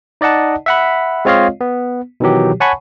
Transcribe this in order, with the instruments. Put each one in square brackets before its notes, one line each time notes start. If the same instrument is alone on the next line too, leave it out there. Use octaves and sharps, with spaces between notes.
[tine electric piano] D#4 D5 D#5 F#5 A5
E5 F#5 B5
G#3 C4 F4 C#5 D#5 F5
B3
B2 D#3 E3 F#3 G4
C#5 F#5 G#5 A5 B5 C#6